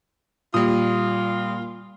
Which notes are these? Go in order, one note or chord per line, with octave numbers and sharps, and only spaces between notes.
A#2 G3 F4 D#6